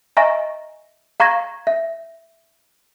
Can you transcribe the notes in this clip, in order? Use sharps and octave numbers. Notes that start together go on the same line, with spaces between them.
D#5 E5 G#5 A#5 C#6 A#6
F5 A#5 C#6 G#6 A#6
E5